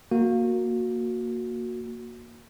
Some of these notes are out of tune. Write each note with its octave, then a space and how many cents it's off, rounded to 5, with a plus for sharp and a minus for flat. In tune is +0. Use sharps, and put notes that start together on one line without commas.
A#3 +0 F#4 -15